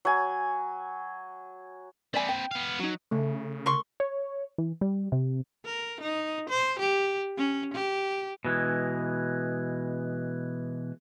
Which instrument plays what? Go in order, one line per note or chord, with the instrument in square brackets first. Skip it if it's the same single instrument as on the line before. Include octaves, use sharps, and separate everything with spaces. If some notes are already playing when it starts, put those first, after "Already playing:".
[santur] F#3 G#5
[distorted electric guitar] C4 B4 [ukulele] D5 E5 G#5
[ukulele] G5
[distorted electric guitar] B3 F5
[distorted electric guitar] F#3 [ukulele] D#4 F#4
[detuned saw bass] C#3 [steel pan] A3
[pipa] A#4 C6 C#6
[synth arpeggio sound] C#5
E3
G3
C3
[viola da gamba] A#4
D#4
C5
G4
C#4
G4
[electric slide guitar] B2 E3 G#3